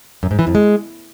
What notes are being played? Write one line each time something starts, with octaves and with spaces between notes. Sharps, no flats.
F#2
G#2
E3
F2
G#3